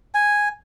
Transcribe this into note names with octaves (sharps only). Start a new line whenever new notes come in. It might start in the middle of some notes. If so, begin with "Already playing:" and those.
G#5